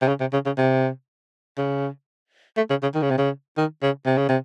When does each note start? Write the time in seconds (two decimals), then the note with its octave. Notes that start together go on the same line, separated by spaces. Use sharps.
0.02 C3
0.08 C#3
0.20 C3
0.33 C#3
0.46 C#3
0.58 C3
1.57 C#3
2.57 A3
2.70 C#3
2.82 C#3
2.95 D#3
3.02 C#3
3.10 C3
3.18 C#3
3.57 D#3
3.82 C#3
4.06 C3
4.17 C#3
4.29 C3